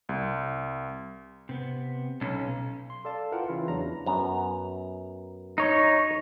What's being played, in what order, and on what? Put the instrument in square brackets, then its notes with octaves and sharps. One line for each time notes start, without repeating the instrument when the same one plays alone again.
[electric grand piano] C2
[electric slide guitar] C3 B3
[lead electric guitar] B1 [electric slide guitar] C#4
[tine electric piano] C6
A4 D5 F5 A5
E4 F4 A#4 B4 F#5 G5
C#3 E3 E4 F4
E2 F#3 D4 A#5
[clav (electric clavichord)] F#2 B3 A#5
[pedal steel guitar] D#4 C#5